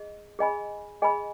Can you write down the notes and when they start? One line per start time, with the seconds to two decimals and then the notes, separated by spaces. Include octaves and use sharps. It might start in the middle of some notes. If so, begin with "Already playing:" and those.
Already playing: G#4 D#5
0.39 G#4 D#5 G#5 B5
1.02 G#4 D#5 G#5 B5